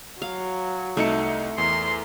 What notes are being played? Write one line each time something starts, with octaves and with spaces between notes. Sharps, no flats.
F#3 F5
C2 A3 D#4 C#7
E2 A#4 C6